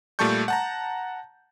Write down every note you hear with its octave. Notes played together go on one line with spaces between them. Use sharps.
A#2 G3 A3 A5 C#6 G6
F#5 A5 A#5